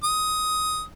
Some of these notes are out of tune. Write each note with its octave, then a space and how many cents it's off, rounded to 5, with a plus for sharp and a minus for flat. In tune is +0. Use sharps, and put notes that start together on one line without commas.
D#6 +15